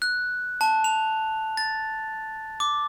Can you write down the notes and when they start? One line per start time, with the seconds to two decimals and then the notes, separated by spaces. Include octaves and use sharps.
0.02 F#6
0.61 A5
0.84 F7
1.57 A6
2.60 D6